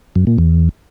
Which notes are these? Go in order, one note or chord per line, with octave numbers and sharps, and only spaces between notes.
F#2
A#2
E2